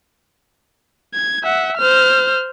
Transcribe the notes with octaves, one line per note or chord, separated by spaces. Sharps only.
G#6
E5 F#5
C5 F6